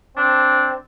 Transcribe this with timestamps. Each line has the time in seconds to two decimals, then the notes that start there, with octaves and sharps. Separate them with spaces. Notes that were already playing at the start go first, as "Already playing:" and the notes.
0.17 C4 D4